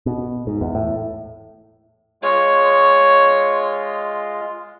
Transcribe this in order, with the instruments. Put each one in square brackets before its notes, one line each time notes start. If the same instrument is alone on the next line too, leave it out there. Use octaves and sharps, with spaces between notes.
[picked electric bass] B2
G#2
E2
A2
[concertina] G#3 F4 [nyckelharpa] C#5